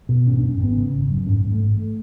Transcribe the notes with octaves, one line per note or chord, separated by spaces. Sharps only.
B2
G#1 C#4
D4
F#2
C#4
G#1 B3
C#3
G#1
F#2
G#2 C#4
G#2 G#3
A3
A1
A3